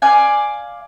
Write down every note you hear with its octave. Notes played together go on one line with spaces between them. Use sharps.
D5 F5 G#5